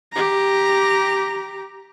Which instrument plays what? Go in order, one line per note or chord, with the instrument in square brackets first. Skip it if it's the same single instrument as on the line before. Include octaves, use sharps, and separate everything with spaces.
[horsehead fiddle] G4 A#5